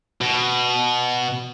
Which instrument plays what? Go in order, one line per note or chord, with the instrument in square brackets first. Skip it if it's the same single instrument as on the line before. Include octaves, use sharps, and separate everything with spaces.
[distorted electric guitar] B2